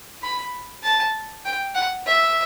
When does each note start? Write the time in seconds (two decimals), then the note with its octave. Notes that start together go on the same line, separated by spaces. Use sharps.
0.22 B5
0.83 A5
1.45 G5
1.75 F#5
2.06 E5